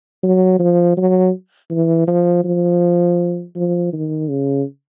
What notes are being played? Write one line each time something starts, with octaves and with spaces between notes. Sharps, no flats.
F#3
F3
F#3
E3
F3
F3
F3
D#3
C#3